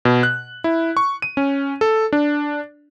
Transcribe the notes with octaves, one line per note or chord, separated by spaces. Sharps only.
B2
F#6
E4
C#6
D#7
C#4
A4
D4